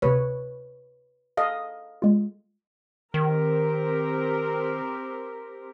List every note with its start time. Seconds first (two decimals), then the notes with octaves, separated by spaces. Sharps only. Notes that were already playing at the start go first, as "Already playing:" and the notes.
0.02 D2 C3 B4 C#5
1.37 A4 D#5 F5
2.02 G#3 F4
3.14 D#3 C4 G4 A#4